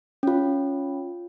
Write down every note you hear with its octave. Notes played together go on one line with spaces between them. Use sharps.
C#4 F4